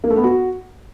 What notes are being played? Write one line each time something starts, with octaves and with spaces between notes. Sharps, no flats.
A#3
A3
B3
F#4